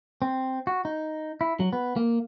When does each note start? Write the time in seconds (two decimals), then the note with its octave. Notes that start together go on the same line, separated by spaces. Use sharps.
0.22 C4
0.67 F#4
0.85 D#4
1.41 E4
1.60 F#3
1.73 B3
1.96 A#3